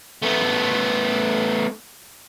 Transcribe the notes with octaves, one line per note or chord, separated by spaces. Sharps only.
A3 B3